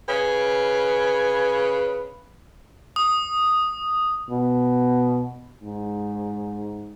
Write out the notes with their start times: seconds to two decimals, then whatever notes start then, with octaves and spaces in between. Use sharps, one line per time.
0.08 C#3 B4 G#5
2.96 D#6
4.30 B2
5.63 G#2